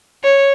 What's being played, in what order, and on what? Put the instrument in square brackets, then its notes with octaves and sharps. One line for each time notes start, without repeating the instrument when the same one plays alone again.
[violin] C#5